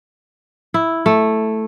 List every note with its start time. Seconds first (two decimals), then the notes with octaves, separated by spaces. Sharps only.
0.74 E4
1.06 A3